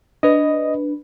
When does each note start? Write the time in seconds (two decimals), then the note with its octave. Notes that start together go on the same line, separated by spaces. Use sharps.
0.23 D4 B4 D#5